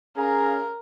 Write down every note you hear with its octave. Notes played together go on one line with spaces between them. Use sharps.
C#4 G#4 A#4 F5 A#5